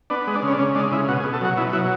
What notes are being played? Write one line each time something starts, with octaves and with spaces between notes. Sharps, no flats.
B3 D4
G#3
D4
C#3
C#4
D4
C#3 C#4
G#3 D4
C#3 E4
B2 F#4
G#4
B2
A4
F#3 F#4
B2 E4
F#3 E4